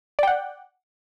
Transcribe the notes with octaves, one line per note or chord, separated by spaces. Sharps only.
D5 F#5 G5